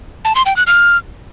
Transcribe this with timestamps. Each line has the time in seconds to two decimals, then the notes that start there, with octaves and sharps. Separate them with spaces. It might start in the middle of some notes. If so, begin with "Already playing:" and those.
0.25 A5
0.35 C6
0.46 G5
0.56 F#6
0.67 F6